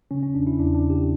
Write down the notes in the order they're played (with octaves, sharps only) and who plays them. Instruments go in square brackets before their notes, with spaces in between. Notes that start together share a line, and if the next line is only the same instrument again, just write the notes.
[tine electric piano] C#3 C#4
C#4
E2 D4
E4
E2 D4
D4
C#3
G4